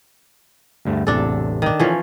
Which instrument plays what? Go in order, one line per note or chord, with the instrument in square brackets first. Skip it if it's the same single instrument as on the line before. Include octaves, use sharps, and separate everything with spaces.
[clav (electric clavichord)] D2 G2 A3
[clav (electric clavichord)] A1 E2 C3 [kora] D4 A4
[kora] D#3 D4
[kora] E3 F3 C#4 [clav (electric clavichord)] A4 C#5